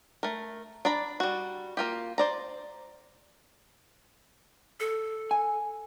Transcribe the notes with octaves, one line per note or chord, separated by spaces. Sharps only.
A3 A#4
D4 D5 A#5 B5
G3 F#4
A#3 F4 G4
C5 D5 A#5
A4
G#5